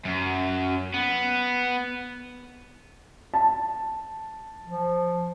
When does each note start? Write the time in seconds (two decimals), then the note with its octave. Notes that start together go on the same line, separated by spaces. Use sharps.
0.05 F#2
0.94 B3
3.34 A5
4.67 F3